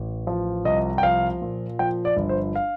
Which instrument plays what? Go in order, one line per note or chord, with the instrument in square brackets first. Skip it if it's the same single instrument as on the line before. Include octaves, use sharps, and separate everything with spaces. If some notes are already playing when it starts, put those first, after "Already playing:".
Already playing: [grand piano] A1
F3
C2 D#5
G5
F3 F5
A#2
F3 G5
D5
G1
C5
F5